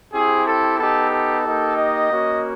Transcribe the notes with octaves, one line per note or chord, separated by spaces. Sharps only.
C4 E4 G4 G#4
A4
B3 D#4 G4 A4
A4
A#3 D#4 G4
D#5
A#3 C#4 F#4